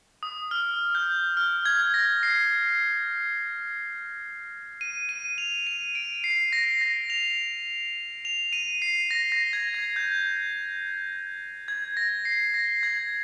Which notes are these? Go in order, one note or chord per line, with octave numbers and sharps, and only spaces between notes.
D#6
F6
G6
F6
G#6
A#6
C7
D#7
D#7
F7
D#7
D7
C7
A#6
A#6
F7
F7
D#7
C7
A#6
A#6
G#6
G#6
G6
G#6
A#6
C7
A#6
G#6